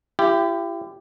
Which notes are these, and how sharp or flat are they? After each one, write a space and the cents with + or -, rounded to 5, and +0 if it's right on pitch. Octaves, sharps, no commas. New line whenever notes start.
E4 +40 G4 +0